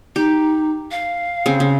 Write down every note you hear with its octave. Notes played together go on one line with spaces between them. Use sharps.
D#4 G4
F5
C#3 C4
C#3